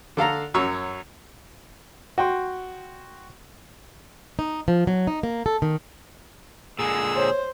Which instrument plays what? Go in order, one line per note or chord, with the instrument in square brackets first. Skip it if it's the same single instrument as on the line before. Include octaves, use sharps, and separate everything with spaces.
[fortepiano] D3 A4 F5 A#5
F#2 F#3 C#5 C#6 E6
F#4 G5 C6
[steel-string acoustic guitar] D#4
F3
F#3
D#4
A#3
A4
D#3
[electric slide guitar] A#2 D3 G#3 [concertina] G#4 E6
[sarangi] C5 [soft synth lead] C#5